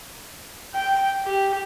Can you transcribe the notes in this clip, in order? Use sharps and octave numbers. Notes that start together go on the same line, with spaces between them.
G5
G4